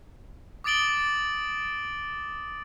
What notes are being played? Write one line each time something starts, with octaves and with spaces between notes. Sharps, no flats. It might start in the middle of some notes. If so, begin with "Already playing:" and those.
D6 D#6 A6 D7 F#7 G7